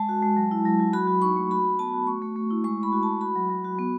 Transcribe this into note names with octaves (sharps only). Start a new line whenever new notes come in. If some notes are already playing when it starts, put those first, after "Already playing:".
Already playing: G#3 A5
F#4
G#3
F#3
E4
F#3
F#3
F#4 B5
F#4
D#4 C#6
A3
F#4 B5
F#4
B3 A5
F#4
A3 C#6
A3
A3
E4
G#3 C#6
G#3
B5
F#4
F#4 A5
F#4 B5
F#3
F#3
F#4
B3